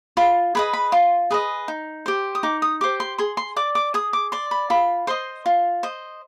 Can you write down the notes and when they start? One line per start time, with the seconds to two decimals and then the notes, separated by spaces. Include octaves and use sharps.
0.17 F4 B5
0.55 G#4 B4 D#5 B5
0.73 B5
0.92 F4 C6
1.31 G#4 B4 D#5
1.68 D#4
2.06 G4 C5
2.35 D#6
2.43 D#4 D6
2.62 D#6
2.81 G4 C5 D6
3.00 C6
3.18 G#4 C6
3.37 C6
3.56 D5 D6
3.75 D6
3.94 G#4 D#6
4.13 D6
4.32 D5 C6
4.51 B5
4.70 F4 B5
5.07 C5 D#5 C6
5.46 F4
5.83 C5 D#5